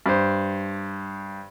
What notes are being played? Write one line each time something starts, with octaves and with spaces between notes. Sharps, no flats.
G2 C5